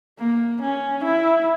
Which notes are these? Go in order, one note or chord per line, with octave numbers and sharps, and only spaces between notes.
A#3
C#4
E4